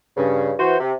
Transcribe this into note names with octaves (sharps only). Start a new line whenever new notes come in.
G2 C#3
E3 F#4 C5
C3